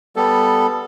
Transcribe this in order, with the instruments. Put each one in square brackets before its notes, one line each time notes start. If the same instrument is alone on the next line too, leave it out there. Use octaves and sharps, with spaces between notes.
[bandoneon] G3 B3 A4